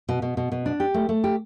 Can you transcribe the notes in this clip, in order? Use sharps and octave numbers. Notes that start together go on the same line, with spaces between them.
B2
B2
B2
B2
D4
G4
A3
A3
G4